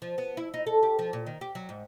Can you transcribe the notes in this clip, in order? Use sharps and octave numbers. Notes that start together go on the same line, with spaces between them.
F3
B3
E4
D#4
A4
G4
F3
A#2
D#3
G4
F#3
G#2